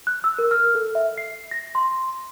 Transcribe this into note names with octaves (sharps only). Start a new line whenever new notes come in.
F#6
E6
A#4
F6
A4
E5
C7
A#6
C6